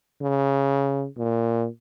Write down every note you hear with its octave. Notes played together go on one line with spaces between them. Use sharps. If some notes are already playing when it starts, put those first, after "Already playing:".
C#3
A#2